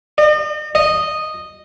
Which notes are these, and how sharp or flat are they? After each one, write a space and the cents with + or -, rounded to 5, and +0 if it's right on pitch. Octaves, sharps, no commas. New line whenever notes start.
D#5 -40
D#5 -5